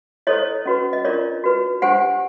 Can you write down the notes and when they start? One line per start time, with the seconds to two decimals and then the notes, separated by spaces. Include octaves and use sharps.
0.27 E4 A4 C5 C#5 D#5
0.66 C#4 F#4 B4
0.93 D#5
1.05 D4 F4 A#4 C#5 D5
1.44 F#4 B4
1.82 D4 G4 C5 F#5 G#5